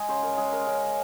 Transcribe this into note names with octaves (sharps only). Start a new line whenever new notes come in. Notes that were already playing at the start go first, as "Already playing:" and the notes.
Already playing: G#3 G#4 D#5
C#3 C5
A#4
G#3 G#4
A#4
C#3